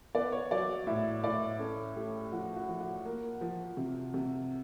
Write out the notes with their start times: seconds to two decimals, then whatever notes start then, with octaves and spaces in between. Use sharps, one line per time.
0.15 B3 D5
0.32 C#5
0.51 F#3 D5
0.87 A2 E5
1.24 A2 D5
1.59 C#4 A4
1.96 A3 G4
2.32 F3 F#4
2.56 F#4
2.68 F3
2.81 F#4
3.05 A#3
3.41 F3
3.77 C3
4.14 C3